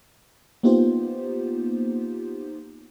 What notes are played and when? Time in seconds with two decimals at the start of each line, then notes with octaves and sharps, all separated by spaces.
0.63 A#3 B3 D#4 F4 G4 C5